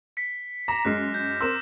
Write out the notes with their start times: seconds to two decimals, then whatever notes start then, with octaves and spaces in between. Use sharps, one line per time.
0.17 B6 C#7
0.68 A#5 D6 A#6 E7
0.85 F#2 G#3 F6 F#6 C7
1.14 G6
1.41 C4 A#4 C6 E6 E7